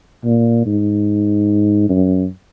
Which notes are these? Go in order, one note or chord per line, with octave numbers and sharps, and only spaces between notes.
A#2
G#2
F#2